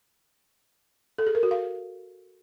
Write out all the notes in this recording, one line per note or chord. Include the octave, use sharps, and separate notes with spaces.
A4
G#4
A#4
F#4
F5